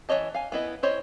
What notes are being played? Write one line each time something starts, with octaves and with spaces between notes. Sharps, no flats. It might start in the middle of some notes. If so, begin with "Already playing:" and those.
E3 E4 C#5 D#5 A5
F5 G#5
B3 E4 D#5
E4 C5 C#5 D#5